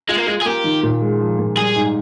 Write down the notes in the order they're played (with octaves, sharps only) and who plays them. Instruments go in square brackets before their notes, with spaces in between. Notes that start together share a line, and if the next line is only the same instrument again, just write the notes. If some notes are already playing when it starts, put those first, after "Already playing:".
[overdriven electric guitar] G#3 [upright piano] F4
[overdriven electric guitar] A#3
[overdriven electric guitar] G#3 [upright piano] F4
[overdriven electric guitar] G#4
[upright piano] A#3 [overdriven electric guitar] G4
[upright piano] D#3
A#2
G#3
F3
A#2
[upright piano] G3 [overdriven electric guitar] G#4
[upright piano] G#2